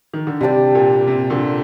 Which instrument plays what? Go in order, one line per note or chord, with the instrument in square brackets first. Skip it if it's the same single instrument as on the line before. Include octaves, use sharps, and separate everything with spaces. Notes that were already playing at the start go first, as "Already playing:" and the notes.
[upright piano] D#3
D3
[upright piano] C3 [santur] G3 D4 G4 D5
[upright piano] A#2
C3
A#2 D3